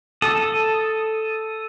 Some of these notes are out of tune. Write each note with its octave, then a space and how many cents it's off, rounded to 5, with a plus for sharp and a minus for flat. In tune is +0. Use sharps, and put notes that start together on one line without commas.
A4 +0 D#6 +0